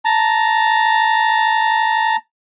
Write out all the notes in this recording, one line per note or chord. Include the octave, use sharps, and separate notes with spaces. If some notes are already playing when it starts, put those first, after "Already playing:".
A5 A#5